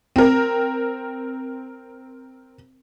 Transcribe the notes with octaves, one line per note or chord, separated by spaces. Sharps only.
C4 A#4